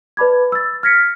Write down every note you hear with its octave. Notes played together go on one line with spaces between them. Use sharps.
B4 D5 A5 B5 D6 G#6
E6 A6
F6 G#6 A#6 B6 C#7